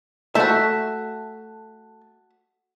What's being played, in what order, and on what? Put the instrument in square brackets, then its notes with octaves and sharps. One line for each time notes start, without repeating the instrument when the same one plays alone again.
[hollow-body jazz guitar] A3 A5 [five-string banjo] F#4 E5